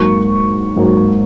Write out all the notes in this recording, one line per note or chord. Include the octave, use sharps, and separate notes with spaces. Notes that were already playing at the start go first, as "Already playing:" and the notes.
Already playing: G#2 F#3 A#3 C#6
G#2 F#3 A#3